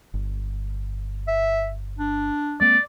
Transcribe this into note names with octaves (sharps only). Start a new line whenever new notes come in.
G1
E5
D4
G#3 A#3 C4 D5